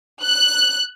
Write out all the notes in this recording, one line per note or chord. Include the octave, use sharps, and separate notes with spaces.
F#6